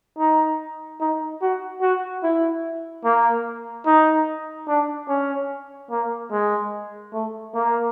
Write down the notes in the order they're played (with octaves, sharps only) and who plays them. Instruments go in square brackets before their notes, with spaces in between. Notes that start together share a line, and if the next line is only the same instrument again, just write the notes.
[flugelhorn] D#4
D#4
F#4
F#4
E4
A#3
D#4
D4
C#4
A#3
G#3
A3
A#3